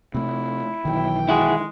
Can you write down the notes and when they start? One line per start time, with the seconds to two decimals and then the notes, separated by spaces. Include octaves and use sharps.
0.14 C3 A3 E4
0.85 B1 D#3 E3 G5
1.29 G#3 E4 F#4 G#4